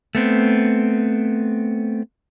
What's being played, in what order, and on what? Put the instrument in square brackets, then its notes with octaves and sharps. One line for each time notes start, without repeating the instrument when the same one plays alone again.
[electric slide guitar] A3 B3 C4